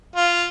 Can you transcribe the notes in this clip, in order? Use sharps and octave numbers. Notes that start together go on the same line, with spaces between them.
F4